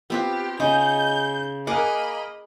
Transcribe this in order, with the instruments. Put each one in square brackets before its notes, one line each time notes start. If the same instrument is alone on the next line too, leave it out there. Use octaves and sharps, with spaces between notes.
[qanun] B3 C4 F4 [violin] G4
[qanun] C#3 G#4 [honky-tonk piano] D#4 [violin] G6
[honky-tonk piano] A#3 A#4 [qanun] G#4 F#5 D6 [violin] D#5 B5